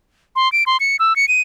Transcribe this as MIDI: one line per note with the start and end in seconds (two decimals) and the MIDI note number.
0.36 0.51 84
0.52 0.64 98
0.66 0.77 84
0.80 0.96 97
0.99 1.16 88
1.16 1.28 97
1.28 1.42 99